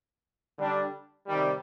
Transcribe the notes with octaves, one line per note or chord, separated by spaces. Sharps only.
D3 G3 D4
C3 D#3 G3